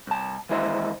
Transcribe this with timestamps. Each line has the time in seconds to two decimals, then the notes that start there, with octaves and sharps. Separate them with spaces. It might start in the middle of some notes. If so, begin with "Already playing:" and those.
0.07 C2 A5
0.49 D#3 E3 G#3 E4 C5 D#5